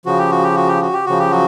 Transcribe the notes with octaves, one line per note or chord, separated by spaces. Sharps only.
C#3 F3 F#4
G4
F#4
G4
F#4
G4
F#4
G4
C#3 F3 F#4
G4
F#3 F#4